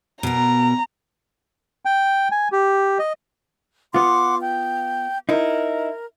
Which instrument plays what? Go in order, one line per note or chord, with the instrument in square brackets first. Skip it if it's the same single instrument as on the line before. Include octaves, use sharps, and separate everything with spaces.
[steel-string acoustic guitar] B2 A#4 [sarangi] A#5
[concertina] G5
G#5
G4
D#5
[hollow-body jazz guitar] B3 F4 [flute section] F#5 C6 D6
[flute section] G5
[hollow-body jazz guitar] D#4 E4 [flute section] A#4